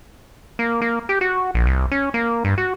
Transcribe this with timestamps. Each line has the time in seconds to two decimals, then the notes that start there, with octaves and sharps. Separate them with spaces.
0.59 A#3
0.82 A#3
1.09 G4
1.21 F#4
1.54 A#1
1.66 C2
1.91 C#4
2.14 A#3
2.45 G2
2.58 F#4